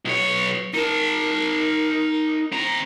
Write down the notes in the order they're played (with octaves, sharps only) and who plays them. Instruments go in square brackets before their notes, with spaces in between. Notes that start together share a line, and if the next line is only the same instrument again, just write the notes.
[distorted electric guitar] B1 C#5
[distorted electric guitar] D#4 A5 [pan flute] A#4
[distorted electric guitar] C4 A#5